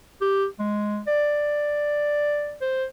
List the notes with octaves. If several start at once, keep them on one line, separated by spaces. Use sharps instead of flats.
G4
G#3
D5
C5